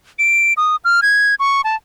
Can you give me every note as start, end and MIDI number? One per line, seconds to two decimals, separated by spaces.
0.19 0.53 98
0.57 0.76 87
0.85 1.00 89
1.02 1.35 92
1.40 1.61 85
1.64 1.76 81